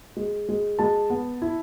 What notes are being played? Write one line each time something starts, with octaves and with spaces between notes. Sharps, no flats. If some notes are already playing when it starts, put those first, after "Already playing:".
G#3
G#3
G#3 A5
B3
E4